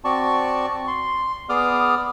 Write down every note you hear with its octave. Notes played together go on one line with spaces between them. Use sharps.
C4 F#4 D5 A5 C#6
C6
B3 G#4 D5 D6 D#6 F6